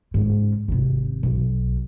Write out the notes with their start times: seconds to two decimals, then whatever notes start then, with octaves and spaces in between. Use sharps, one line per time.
0.14 G#2 C#3
0.68 G#1 C3
1.23 B1